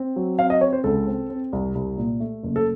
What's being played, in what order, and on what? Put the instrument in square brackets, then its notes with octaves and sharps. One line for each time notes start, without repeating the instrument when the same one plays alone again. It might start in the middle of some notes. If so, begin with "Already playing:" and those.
Already playing: [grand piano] C4
F#3
C4 F5
D#5
C4 C#5
C5
C#2 A4
C4
C4
C2
C2
A#2
A3
F#1
A4